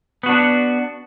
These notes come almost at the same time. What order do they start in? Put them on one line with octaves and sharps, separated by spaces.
B3 F#4 D4